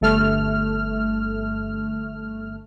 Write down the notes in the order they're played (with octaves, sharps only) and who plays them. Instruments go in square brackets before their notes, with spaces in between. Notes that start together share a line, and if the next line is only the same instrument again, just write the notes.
[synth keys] G1 A3 F6